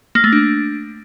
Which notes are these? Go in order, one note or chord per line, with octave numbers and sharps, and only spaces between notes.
A#3
A3
D4